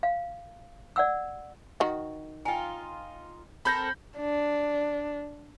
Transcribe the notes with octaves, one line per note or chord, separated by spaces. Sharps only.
F5
D5 F#5 E6
D#3 F#4
D#4 F4 G5 G#5
C4 A4 A#4 B5 G6 A#6
D4